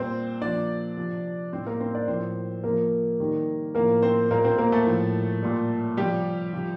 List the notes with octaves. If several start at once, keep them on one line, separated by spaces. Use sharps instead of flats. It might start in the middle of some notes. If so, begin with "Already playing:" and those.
Already playing: A#2 G3 C4 C5
A#2 F3 D4 D5
C3 F3
A2 G3 C4 C5
A#3 A#4
C4 C5
D4 D5
A2 F3 C4 C5
C3 F3 A#3 A#4
C3 D#3 G3
A2 F3 A#3 A#4
C4 C5
A#2 G3 A#3 A#4
C4 C5
A#3 A#4
A3 A4
A2 F3
A#2 G3
C3 F3 G3 G4
C3 F3